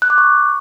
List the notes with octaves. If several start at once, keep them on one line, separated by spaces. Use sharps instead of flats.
F#6
D6
C#6